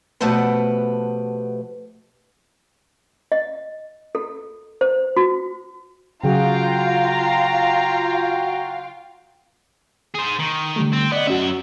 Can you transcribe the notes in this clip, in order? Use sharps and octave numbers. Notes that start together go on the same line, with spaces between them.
B2 F3 A3 G4 B4 F#5
D#5
A4
C5
F#4
C#3 F#3 F4 F#4 G#4 F5 G5 A#5
G#4 C5
D#3
D3 G3 A3
C4
B3 D5 D#5
F#2 C#4 F#4 E5